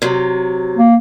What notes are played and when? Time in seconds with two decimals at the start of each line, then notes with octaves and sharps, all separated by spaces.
0.02 C3 F#3
0.77 A#3